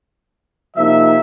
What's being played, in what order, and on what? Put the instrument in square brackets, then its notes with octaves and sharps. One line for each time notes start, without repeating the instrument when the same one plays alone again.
[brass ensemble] C3 F3 A#3 D#4 E5